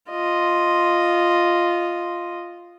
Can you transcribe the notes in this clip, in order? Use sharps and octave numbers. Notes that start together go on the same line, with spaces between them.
F4 D#5